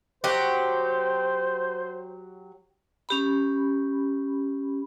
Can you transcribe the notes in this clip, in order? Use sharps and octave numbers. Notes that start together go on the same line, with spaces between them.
F#3 G4 C5
C#4 G4 B5